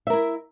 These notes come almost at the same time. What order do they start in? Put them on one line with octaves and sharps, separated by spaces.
E5 A#4 E4